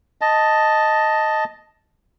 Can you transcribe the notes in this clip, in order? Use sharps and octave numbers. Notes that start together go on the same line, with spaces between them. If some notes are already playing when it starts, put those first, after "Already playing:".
D#5 A5